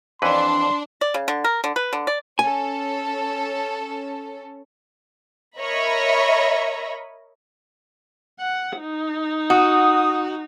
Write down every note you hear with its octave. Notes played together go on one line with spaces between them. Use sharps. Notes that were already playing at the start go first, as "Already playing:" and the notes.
F2 E3 D4 B4 C6
D5
C#3
D3
A#4
D3
B4
D3
D5
C#4 A4 G#5
A#4 C#5 D#5 E5 B5
F#5
D#4
F#4 D#6